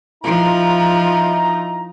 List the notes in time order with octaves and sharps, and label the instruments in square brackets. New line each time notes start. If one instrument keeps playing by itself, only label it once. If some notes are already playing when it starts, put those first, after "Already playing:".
[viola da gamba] F3 [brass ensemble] D#4 E4 A#5